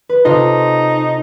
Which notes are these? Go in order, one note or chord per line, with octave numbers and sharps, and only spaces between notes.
B4
C3 D#4 F4 A4